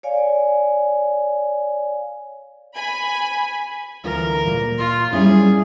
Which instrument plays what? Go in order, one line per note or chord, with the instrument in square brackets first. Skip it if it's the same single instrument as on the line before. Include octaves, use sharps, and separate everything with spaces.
[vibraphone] C#5 D5 F5 G#5
[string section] G#5 B5
[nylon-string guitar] D2 E3 F4 [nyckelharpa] A#4
[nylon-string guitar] A#2 A#3
[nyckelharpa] F4 C6
[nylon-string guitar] G3 C#4 E4 [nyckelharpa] G#4